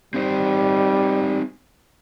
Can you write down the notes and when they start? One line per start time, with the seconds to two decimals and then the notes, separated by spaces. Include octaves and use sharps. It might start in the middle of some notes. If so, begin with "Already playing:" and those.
0.14 G3 C4 D#4 C5